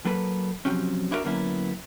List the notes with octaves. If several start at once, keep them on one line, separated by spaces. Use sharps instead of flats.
F#3 A#3 A4 B4
C3 F3 F#3 C4 C#4
D4 E4 F#4 A#4 D5 E5
D3 F#3 A#3 B3 C#4 E4